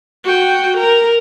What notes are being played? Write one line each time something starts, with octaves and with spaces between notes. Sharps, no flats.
F#4 G5
A#4